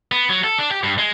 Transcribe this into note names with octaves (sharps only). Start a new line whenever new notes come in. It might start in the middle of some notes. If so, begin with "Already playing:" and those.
B3
F#3
A4
D4
G4
G2
G#3